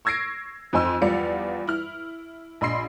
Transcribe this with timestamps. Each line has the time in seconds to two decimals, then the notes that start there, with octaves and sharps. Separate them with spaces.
0.05 C#6 E6 G#6 A#6 C7 D7
0.73 F2 C4 D#4 G#5 C6 E6
1.02 E2 F3 G3 D5 F5 C#7
1.67 E4 F6
2.61 A#1 D#5 B5 C6 C7